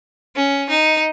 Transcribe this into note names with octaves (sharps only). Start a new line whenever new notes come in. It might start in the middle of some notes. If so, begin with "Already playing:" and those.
C#4
D#4